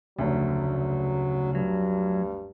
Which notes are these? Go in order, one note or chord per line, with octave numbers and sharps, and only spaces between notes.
F1 D2 C#3 F#3
G2 F#3